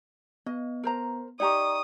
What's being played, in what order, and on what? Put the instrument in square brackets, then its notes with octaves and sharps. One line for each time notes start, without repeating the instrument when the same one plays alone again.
[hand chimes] B3 [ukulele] D#5
[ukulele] A#4 C5 A#5
[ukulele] D#4 G4 A#5 [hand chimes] D5 C#6 [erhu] D#6